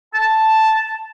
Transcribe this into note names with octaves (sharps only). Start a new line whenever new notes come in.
A5